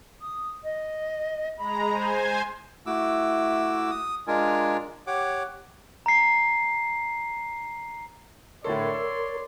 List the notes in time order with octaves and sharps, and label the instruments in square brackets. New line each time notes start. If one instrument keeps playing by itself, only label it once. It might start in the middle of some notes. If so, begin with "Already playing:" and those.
[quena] D#6
D#5
[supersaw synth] G#3 A#5 [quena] B5
[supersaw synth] C5 G#5
[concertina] A3 E4 F#4 D6 E6
D#6
G#3 D4 F4 A#4 G#5
G4 C#5 F#5 D6
[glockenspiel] A#5 C7
[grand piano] A2 D3 A4 [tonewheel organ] A#4 [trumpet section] C#5 D5 C6
[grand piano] E6